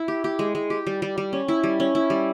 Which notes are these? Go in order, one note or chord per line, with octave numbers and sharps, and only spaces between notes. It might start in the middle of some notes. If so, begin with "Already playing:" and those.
Already playing: E4
G4
G4
G#3
G#3
G4
G3
G3
G3
C#4
E4
G3
C#4
E4
G3